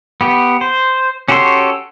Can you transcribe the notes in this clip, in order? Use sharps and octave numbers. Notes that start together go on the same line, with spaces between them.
B3 G4
C5
C#4 F#4 G4 A4 C6